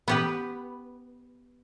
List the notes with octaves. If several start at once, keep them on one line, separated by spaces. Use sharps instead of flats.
B3 G4 B4